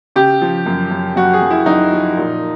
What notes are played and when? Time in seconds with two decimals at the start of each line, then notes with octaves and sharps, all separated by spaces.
0.16 C#3 G4
0.41 F3
0.66 F#2
0.91 F#2
1.16 F#2 F#4
1.34 G#4
1.42 F#2
1.50 E4
1.66 F#2 D#4
1.92 F3
2.17 A#2